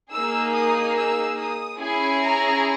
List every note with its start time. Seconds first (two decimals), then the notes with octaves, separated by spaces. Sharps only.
0.12 A#3 D#4 G#4 E6
0.54 D#6
0.96 E6
1.39 D#6
1.80 C#4 E4 G#4 G#5
2.23 A#5